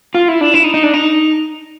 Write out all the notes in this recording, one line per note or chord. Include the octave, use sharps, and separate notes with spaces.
F4
E4
D4
E4
D#4
D#4
D4
D#4